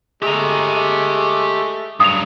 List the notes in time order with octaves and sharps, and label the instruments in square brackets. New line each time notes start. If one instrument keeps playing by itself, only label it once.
[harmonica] G#3 A3 [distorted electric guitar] G4 A#5
[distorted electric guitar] G2 F#3 [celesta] D#6 F7